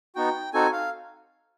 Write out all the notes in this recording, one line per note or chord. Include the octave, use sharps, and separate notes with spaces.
B3 D#4 F#4 G5
C4 D#4 F#4 A4 G#5
F5